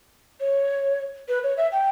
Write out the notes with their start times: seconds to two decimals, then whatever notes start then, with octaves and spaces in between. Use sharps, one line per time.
0.40 C#5
1.28 B4
1.43 C#5
1.57 E5
1.72 G5